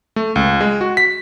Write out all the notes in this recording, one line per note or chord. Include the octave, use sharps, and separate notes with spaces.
A3
C#2
G#3
F#4
B6